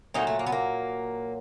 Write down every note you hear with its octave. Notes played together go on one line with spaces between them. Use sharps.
A#2 F#3 A3 D#4
A3
A#3
B3
A#3